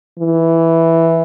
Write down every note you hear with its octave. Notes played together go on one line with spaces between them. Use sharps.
E3